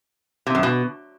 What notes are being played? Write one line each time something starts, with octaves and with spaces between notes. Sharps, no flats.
C3
F#2
B2